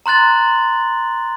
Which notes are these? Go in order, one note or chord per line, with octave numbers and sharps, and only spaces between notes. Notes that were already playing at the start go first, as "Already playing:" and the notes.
A#5 C6 F#6 A6 F#7